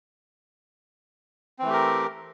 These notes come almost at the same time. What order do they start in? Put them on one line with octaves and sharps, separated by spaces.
C4 E3 A3 G4 A#4